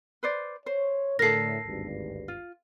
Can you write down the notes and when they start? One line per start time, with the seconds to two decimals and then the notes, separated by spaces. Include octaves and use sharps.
0.23 B4 C5 D5
0.66 C5 C#5
1.19 A2 D3 A4 A#4 A#6 C7
1.66 G#1 D2 G2
2.28 F4